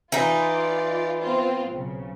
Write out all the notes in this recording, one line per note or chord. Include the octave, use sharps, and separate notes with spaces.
E3 D#4 F4 D5
B3 C4 F4
B1 C#3